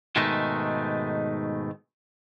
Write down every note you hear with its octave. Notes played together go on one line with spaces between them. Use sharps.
G#2 B2 D#3 G#3 A3 D#4